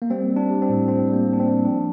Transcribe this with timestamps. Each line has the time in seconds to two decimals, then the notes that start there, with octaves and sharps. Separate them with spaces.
0.02 A#3
0.10 G3 C4
0.31 G3
0.36 D4
0.50 G3
0.62 C4
0.69 A2
0.88 A2 C4
1.07 G3
1.13 A#3
1.26 G3
1.33 D4
1.40 C4
1.46 G3
1.65 F3 D4